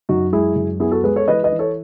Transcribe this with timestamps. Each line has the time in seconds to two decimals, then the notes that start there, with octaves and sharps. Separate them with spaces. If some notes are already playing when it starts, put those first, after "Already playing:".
0.09 F#2 D#4 F#4
0.32 G#3 E4 G#4
0.56 F#2
0.80 B3 E4 G#4
0.91 F#4 A4
1.04 G#3 G#4 B4
1.16 A4 C#5
1.28 E3 B4 D#5
1.44 B4 D#5
1.52 E3
1.59 A4 C#5